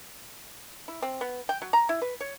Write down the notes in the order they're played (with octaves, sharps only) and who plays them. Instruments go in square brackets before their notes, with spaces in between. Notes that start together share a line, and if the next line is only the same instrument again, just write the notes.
[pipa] E4
C4
B3
G5
F#3
A#5
E4
B4
C#5